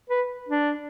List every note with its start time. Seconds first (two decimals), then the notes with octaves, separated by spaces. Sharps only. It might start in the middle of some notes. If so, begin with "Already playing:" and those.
0.10 B4
0.49 D4